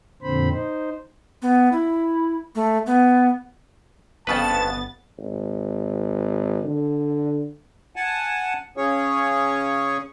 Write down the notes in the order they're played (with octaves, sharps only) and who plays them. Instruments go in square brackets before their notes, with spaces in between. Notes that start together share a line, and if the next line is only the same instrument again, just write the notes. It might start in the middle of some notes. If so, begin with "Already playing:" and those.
[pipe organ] F2 A#2 D3 C4 C5 B5
D#4 C5
[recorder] B3
E4
A3
B3
[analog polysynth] G1 B3 A6 [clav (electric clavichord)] F2 C#3 B4 [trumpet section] A5
[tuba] G#1
D3
[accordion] F#5 G#5 A5
C#3 C#4 G#4 C#5 C#6